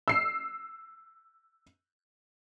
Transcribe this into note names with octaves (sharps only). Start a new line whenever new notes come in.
E6 C7